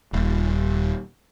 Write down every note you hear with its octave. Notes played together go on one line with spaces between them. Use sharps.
D#1